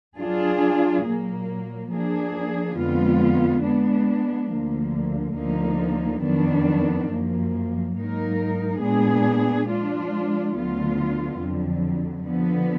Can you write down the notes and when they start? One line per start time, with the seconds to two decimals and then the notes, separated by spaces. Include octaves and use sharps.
0.17 F#3 D4 F4 G#4
1.04 A#2 F#3 A#3
1.91 F3 A#3 D4 G#4
2.76 F2 D3 G#3 B3 F4
3.63 G#3 B3 D4
4.49 D2 D3 F3 A#3
5.35 D2 D3 F3 A#3 D#4
6.21 F2 D#3 F#3 B3 D4
7.07 F#2 F3 A#3
7.94 G#2 F#3 A#3 D#4 A#4
8.80 A#2 G#3 B3 D4 G#4
9.66 F3 G#3 D4 F4
10.53 D2 D3 F#3 B3 F4
11.39 F2 D3 F#3
12.25 D3 F3 B3